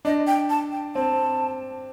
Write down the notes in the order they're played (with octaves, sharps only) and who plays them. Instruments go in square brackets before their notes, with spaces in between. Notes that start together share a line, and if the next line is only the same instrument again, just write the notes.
[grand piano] D4 [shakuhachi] D#5
[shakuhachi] G5
A5
G5
[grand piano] C4 [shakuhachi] A5